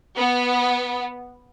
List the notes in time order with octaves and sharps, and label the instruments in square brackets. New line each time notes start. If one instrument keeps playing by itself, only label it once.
[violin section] B3